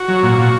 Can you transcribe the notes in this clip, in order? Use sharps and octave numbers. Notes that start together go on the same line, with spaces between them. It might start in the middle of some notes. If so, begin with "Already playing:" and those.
Already playing: F#4
F#3
A#2
A#2